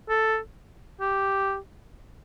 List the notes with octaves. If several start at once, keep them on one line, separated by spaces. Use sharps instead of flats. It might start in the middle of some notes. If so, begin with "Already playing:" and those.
A4
G4